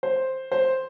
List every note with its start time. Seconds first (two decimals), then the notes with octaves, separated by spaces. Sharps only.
0.03 C5
0.52 C5